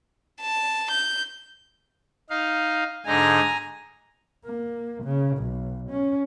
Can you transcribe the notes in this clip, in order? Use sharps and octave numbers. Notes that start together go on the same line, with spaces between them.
A5
G6
D#4 F5
G#2 D3 D#4 G#5 A#5
A#3
C#3
B1
C#4